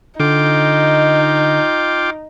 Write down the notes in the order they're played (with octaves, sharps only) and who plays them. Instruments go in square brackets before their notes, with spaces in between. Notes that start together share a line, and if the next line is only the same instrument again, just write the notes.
[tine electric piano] D3 [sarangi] D#4 [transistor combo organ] F4 G5 D6